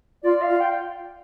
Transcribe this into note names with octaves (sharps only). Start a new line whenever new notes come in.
F4 D5
F5
F4
G5